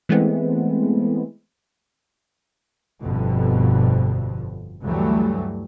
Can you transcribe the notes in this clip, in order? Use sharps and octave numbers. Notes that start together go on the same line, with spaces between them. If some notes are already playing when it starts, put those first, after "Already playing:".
E3 G#3 A3 B3 C4
G1 F2 B2 D3 F3
D2 G2 E3 F#3 G3 A3